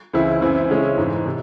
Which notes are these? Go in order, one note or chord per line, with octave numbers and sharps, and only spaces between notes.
C#2 C#3 E3 C4 E4
F#2 E3 C4 E4
C#3 G#3 C#4 E4
G#2 E3 C4
C3